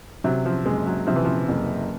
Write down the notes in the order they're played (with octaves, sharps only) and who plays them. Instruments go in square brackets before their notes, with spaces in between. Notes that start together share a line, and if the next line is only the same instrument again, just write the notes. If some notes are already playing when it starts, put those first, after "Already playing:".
[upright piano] C3 [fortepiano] F#3
[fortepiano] F3
[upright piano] F#1 [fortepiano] G#3
[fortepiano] F#3
[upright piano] C3 [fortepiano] F3
[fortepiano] E3
F3
[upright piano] F#1